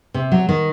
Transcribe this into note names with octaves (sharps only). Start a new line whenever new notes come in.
C3
F#3
D#3